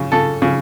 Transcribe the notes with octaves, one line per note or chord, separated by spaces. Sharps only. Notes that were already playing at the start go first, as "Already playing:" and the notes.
Already playing: C#3
C#3 A4
C#3